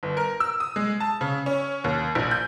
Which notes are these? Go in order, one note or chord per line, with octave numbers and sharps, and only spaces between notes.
G1
A#4
E6
D#6
G#3
A5
C#3
C#4
D#2
A#1
G6